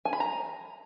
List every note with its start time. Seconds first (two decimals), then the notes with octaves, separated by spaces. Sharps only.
0.05 G#5
0.13 B5
0.20 A#5